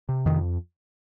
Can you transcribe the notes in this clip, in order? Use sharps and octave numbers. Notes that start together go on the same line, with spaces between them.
C3
F2 D#3